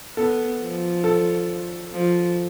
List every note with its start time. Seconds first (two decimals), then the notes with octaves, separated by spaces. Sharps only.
0.17 B3 A4
0.61 F3
1.04 A4
1.93 F3